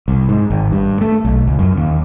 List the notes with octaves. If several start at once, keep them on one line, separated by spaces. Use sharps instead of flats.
C2
G#2
G#1
G2
A3
B1
C#2
F#2
D#2